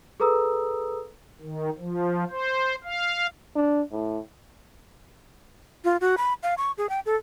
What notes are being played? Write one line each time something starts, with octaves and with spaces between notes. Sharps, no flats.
G#4 A4 B4 A#5 D#6 E6
D#3
F3
C5
F5
D4
A2
F4
F#4
B5
F5
C#6
G#4
G5
A4